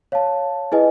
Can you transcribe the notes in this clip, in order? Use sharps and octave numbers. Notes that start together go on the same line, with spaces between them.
C#5 F5 A5
E4 G#4 B4 D#5 G#5